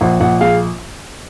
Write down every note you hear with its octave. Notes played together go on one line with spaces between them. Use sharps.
A#1 F#5
A#1 F#5
G#3 F5